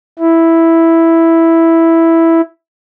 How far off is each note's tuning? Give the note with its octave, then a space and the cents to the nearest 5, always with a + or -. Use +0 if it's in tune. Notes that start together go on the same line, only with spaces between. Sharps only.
E4 +0